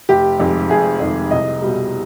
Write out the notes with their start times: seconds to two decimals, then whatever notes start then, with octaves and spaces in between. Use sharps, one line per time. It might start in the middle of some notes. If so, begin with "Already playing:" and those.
0.09 F1 G4
0.40 F2 D#3 G#3
0.69 F1 G#4
1.00 F2 D#3 G#3
1.31 C2 D#5
1.62 B2 G3